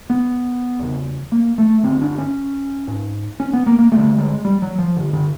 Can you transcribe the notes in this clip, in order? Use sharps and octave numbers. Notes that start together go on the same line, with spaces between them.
B3
E2 C#3
A#3
A3
G2 D3 C4
D4
C#4
G#2
C#4
B3
A#3
A#3
G2 D3 A3
G#3
G3
F#3
F3
G2 D3
D3